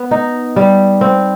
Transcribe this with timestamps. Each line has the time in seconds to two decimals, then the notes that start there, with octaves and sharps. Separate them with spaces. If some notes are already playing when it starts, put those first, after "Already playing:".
Already playing: B3
0.11 D#4
0.56 G3
1.01 C4